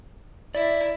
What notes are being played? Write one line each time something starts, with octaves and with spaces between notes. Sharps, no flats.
E4 D5